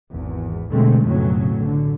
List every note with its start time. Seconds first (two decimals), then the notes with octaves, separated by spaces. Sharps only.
0.12 G#1 E2
0.72 B2 D3 G#3 A3 C4
1.04 B1 F2 A2 C#3 F#3
1.62 D3